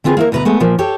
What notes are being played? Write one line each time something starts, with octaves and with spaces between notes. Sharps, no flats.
D3 C4 F4 G#4 B4
A#3 E4 A#4
D2 B2 B4 D#5 A#5
G#3 A3 B3
A#2 F3 A#3
G4 A4 C#5